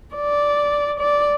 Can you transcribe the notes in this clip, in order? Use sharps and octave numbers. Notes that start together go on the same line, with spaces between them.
D5
D5